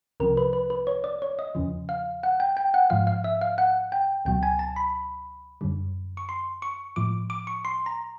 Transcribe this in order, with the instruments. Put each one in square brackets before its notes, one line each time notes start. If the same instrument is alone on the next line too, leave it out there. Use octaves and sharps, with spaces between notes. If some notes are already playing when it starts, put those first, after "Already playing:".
[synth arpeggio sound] C2 C3 F3 A#4
B4
B4
B4
C#5
D5
C#5
D#5
E2 C#3 F3
F5
F#5
G5
G5
F#5
G#2 F3 F5
F5
E5
F5
F#5
G5
C#2 B2 F#3 G5
G#5
A5
B5
F#2 D3 G3
C#6
C6
C#6
A2 F3 D6
D6
C#6
C6
A#5